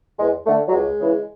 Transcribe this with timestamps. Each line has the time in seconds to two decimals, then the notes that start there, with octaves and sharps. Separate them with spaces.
0.19 E2 G#3
0.46 D3 A3
0.68 F#3
0.72 C#2 G#3
0.99 C#3 E3